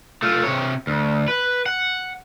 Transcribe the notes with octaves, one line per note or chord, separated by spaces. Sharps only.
A3 F4
C3 C#5
D2
B4
F#5